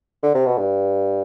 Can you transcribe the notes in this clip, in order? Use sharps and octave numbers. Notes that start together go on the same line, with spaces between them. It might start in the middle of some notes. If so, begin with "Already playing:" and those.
D3
C3
B2
G2